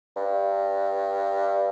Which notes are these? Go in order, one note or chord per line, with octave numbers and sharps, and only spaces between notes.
G2